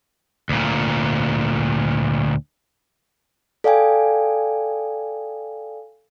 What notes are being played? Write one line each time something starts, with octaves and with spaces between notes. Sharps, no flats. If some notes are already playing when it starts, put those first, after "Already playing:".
D2 A#2
A4 D5 F5 G5 G#5